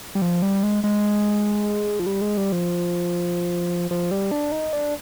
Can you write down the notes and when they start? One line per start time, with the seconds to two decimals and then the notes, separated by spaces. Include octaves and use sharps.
0.15 G3
0.22 F3
0.42 G3
0.63 G#3
0.84 G#3
1.99 F3
2.06 G3
2.21 G#3
2.37 G3
2.52 F3
3.91 F3
4.11 G3
4.31 D4
4.52 D#4
4.73 D4